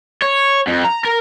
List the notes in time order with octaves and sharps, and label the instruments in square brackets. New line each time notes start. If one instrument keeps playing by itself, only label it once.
[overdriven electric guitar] C#5
F2
A#5
A#4